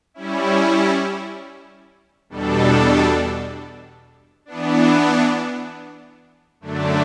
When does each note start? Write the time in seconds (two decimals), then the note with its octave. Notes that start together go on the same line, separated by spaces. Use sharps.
0.14 G3 C#4 E4
2.29 E2 B2 G3 D4 A4
4.46 E3 B3 D4
6.61 F#2 D3 A3 D4